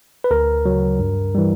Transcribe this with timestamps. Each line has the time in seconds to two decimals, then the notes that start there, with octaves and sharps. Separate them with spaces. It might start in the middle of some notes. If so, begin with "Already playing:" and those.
0.24 B4
0.31 D2 A#4
0.66 C#3 F#3
0.99 G2
1.35 E3 G3